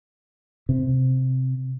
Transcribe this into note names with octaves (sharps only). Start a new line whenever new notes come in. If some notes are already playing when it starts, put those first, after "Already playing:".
C3